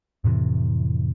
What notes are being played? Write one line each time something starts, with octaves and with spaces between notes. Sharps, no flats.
F2 A2 C3 E3